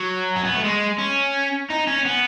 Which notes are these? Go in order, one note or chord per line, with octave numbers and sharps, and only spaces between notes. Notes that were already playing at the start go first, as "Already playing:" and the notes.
Already playing: F#3
C#4
B3
A3
G#3
C#4
D#4
C#4
B3